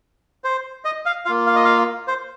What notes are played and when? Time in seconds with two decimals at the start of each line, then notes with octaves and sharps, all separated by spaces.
0.44 C5
0.85 D#5
1.06 F5
1.25 A#3 F4 F5
1.46 F5
1.55 D#5
1.65 F5
2.08 C5